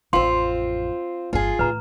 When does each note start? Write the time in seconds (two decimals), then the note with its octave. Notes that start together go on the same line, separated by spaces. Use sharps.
0.13 A1 F2 C4 F4 F5 C6
1.33 G1 E2 F4 G#4
1.59 A2 E3 B4 A#5